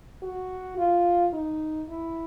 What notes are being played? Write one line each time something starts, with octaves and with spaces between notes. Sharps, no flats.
F#4
F4
D#4
E4